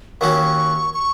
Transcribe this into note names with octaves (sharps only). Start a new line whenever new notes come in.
D#2 D#3 F#3 C#4 F#4 C#6
C#6